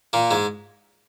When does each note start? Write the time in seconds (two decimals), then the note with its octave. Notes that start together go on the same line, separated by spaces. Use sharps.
0.13 A#2 A#3
0.31 G#2 G#3